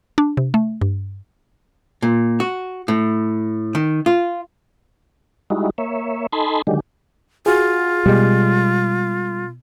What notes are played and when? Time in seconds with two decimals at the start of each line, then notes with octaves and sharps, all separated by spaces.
0.18 D4
0.37 C3
0.54 A3
0.81 G2
2.02 A#2
2.40 F#4
2.88 A2
3.75 D#3
4.06 F4
5.50 G3 G#3 D#4 E4 F#4
5.78 A#3 C#5 E5
6.33 D#4 A4 G#5 A5 B5 C6
6.67 D3 D#3 F#3 G#3 G4
7.46 F4 F#4 G#4
8.06 B2 G3 G#3